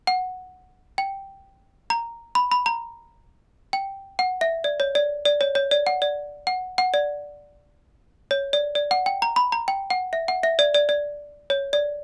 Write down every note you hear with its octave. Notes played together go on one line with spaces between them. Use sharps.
F#5
G5
A#5
B5
B5
A#5
G5
F#5
E5
D5
C#5
D5
D5
C#5
C#5
D5
F#5
D5
F#5
F#5
D5
C#5
D5
D5
F#5
G5
A#5
B5
A#5
G5
F#5
E5
F#5
E5
D5
D5
D5
C#5
D5